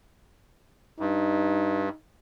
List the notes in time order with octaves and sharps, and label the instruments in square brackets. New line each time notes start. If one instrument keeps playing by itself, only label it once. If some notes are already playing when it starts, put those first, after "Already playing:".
[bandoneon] G2 [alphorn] D#4